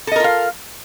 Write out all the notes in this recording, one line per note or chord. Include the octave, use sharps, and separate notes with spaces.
F4 A4 A#4 D#5 F5